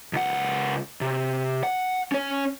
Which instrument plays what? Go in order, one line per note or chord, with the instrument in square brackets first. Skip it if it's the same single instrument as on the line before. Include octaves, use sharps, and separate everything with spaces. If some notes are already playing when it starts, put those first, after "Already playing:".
[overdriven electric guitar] C#2 F#5
C3
F#5
C#4 C#5